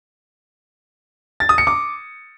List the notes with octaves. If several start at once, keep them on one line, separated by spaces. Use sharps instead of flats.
A6
D#6
C#7
D6